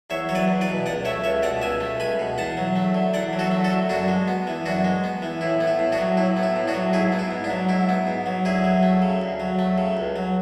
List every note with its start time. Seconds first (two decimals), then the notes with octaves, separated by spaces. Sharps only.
0.10 E2 C#5 E5
0.29 F#3 C#5
0.35 B4 D5
0.48 E2
0.61 B4 D5
0.68 B2
0.86 C#2 D5 F#5
1.05 A3 C#5 E5
1.24 C#2 C#5 E5
1.43 B2 D5 F#5
1.62 C#2 E5 G#5
1.80 A3
2.00 C#2 G#5 B5
2.19 B2
2.38 E2 F#5 A5
2.57 F#3
2.76 A3
2.95 D3
3.13 E2 D5 F#5
3.33 F#3
3.39 F#4 A4
3.51 A3
3.64 F#4 A4
3.70 D3
3.89 F#2 D4 F#4
4.08 G#3
4.28 B3
4.47 E3
4.66 F#2 D4 F#4
4.85 G#3
5.04 B3
5.22 E3
5.41 A2 E4
5.60 B3
5.67 E4
5.79 A2
5.92 D4 F#4
5.99 F#3
6.17 A2 E4
6.37 B3
6.43 E4
6.56 A2
6.68 D4 F#4
6.74 F#3
6.93 G#2 E4 G#4
7.12 B3
7.19 E4
7.31 G#2
7.44 D4
7.50 F#3
7.69 G#2 E4
7.89 B3
8.07 G#2
8.26 F#3
8.45 D2 E4 G#4
8.64 F#3
8.83 A3
9.02 C#3
9.22 D2
9.40 F#3
9.59 A3
9.78 C#3
9.97 C#2
10.16 F#3